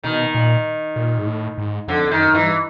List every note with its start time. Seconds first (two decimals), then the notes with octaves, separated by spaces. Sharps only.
0.03 B2 D#3
0.34 A#2
0.96 A#2
1.18 G#2
1.26 A2
1.58 G#2
1.88 F2 D3
2.07 F2
2.11 F#2 D#3
2.34 G2 E3